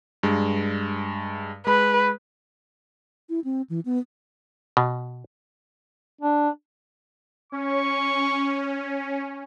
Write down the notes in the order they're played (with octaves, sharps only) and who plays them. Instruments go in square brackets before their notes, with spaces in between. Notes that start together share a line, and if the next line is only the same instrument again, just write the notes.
[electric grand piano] G2 G#3
[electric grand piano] G#3 B5 [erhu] B4
[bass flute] E4
C4
E3
B3
[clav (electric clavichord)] B2
[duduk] D4
[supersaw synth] C#4 [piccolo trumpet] C#6